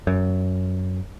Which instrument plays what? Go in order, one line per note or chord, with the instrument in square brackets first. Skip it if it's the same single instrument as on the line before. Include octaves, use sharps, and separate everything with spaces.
[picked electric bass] F#2